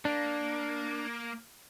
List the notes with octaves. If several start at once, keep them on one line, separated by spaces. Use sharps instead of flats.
A#3 D4